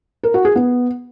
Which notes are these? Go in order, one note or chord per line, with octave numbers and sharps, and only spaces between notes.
A#4
F#4
G#4
B3